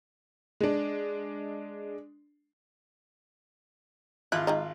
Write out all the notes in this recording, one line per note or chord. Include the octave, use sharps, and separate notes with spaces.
G#3 D4
G#1 E4 F4 F#6
D#3 G#3 D#4